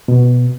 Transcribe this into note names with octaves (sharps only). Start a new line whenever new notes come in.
B2